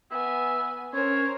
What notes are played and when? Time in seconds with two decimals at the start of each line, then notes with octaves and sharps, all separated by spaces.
0.11 B3 E5 G#5
0.93 C#4 A#4 C5 C#5